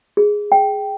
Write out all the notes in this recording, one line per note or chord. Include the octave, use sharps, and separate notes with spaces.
G#4
G5